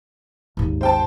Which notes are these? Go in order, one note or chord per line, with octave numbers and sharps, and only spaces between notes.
G#1 D#2
C5 G5 A5